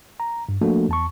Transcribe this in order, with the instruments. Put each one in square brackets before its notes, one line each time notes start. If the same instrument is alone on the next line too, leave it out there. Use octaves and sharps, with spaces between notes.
[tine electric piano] A#5
G2
F3 A3 A#3 D4 F#4 A4
E2 A5 C#6